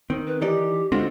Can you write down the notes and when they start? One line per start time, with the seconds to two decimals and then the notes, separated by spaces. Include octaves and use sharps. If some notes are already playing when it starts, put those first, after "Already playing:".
0.10 D#3 C4
0.27 B4
0.41 E3 D#4 G4 D5
0.92 D3 G#3 C4 F4 F#4